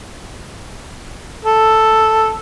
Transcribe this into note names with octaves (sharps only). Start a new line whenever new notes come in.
A4